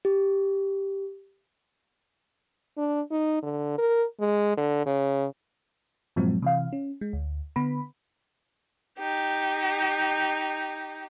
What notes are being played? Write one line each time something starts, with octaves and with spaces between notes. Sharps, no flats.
G4
D4
D#4
D3
A#4
G#3
D3
C#3
G2 A#2 F3 F#3 G#3 C4
C3 E3 F5
C#4
G#3
D2
D3 B3 B5
D#4 G4